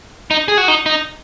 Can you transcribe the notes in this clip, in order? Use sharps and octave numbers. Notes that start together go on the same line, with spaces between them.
D#4
G#4
F#4
D#4
D#4